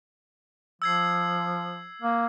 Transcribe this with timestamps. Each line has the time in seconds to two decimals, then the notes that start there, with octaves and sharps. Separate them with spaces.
0.82 F3 E6 G#6 C7
2.02 A#3